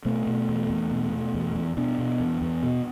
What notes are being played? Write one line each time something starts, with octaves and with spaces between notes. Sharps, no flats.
B2 A3 C4
B2
E2
E2
B2
B2
E2
E2
B2 B3 D4
B2
E2
E2
B2